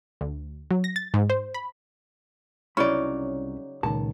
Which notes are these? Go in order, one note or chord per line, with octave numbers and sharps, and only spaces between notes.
D2
F#3
A#6
A6
G#2
C5
B5
C2 C#3 F#3 C#4 D#4 E4 D5 B5
C#2 A#2 D#3 A5